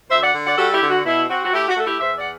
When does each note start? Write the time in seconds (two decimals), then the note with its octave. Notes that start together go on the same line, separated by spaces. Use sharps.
0.10 D2 C5 E5
0.22 D5 F#5
0.34 D3
0.45 D5 F#5
0.58 G3 F#4 A4
0.73 E4 G4
0.82 D3
0.89 F#4
1.05 B2 E4
1.29 C4 F#4
1.44 F#4
1.52 A3 E4 G4
1.69 F#4
1.76 A3 A4
1.85 E4 G4
2.00 E2 C5 E5
2.17 D5 F#5